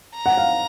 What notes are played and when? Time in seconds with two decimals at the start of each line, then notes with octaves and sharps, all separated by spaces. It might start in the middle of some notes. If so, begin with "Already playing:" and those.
0.16 A#5
0.26 F#5
0.38 F5